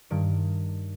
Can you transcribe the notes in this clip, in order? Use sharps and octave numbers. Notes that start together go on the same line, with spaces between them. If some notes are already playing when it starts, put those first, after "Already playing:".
G2 D#3 D7